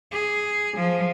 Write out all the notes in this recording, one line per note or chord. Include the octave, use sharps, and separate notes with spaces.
G#4
F3